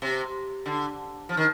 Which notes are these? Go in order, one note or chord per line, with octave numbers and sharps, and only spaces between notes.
C3
D3
F3
D#3